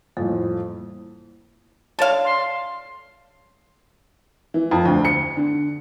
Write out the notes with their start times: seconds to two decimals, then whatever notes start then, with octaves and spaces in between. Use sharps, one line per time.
0.17 F2 A2 E3 G3 A#3
1.99 D3 C#5 F5 A5
2.25 C6
4.54 E3
4.71 F2
4.85 D2
5.05 C#7
5.37 D3